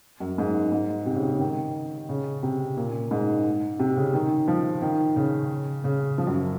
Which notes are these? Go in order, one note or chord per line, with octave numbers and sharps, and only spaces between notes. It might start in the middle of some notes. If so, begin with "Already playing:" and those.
F#2
G#2
G#2
C3
C#3
C3
C#3
D#3
C#3
C3
A#2
G#2
C3
C#3
D#3
F3
D#3
C#3
C#3
F3
F#2